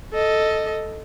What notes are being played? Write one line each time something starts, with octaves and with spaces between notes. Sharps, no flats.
A4 D#5